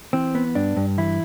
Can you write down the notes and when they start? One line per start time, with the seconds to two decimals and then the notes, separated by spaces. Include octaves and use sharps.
0.13 E3 C4
0.35 B3
0.55 G2 D4
0.77 G2
0.98 E3 E4